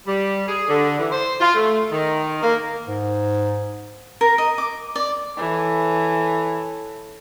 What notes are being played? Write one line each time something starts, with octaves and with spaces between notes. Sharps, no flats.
G3
G#4
D3
E3
C5
F4
A3
D#3
A#3
G#2
A#4
D#5
D6
D5
E3 A4 C#5